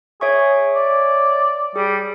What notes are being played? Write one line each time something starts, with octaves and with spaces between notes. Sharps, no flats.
G#4 C#5 E5 C#6
D5
G3 G#4